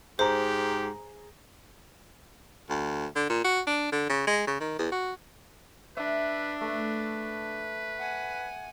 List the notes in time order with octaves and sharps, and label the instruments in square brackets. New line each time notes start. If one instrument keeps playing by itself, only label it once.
[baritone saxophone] G#2 [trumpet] G4 [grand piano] G#4 A#5 [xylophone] C5
[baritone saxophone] D2
D3
A#2
F#4
D4
D3
C#3
G#3
C#3
D#3
E2
F#4
[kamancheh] D4 [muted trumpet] B4 [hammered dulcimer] E5
[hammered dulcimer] A3 [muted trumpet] B4
[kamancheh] F#5 G#5